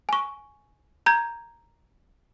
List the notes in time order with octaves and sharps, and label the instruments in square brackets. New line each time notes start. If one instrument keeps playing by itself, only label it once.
[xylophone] G#5 C#6
A#5 G6 G#6